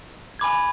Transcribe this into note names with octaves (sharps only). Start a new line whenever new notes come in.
G#5 B5 D6 G#6